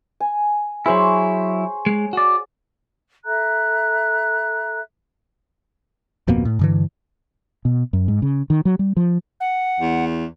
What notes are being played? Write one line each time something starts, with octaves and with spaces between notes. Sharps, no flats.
G#5
F#3 E4 G#4 C5 C#5
G#3
F#4 D5
A4 E5 A#5 F#6
D1 F2 B2 A#3
A2
G2 D3 E3
B2
F#2
G#2
C#3
D#3
F#3
G3
F3
F#5
E2